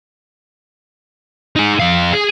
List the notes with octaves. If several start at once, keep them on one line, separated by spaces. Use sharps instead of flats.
D#4 G#4
F2 F5
G#4